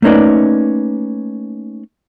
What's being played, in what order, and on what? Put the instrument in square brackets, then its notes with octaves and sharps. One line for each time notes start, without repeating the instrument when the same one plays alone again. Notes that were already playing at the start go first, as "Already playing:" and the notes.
[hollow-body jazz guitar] A3 A#3 C#4 D#4 B4 D5